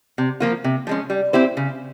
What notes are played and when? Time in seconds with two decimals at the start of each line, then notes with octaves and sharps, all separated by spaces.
0.18 C3
0.40 F3 A#3 F4
0.64 C3
0.87 F3 G#3 C#4
1.10 G3
1.33 C4 E4 G4 C5
1.57 C#3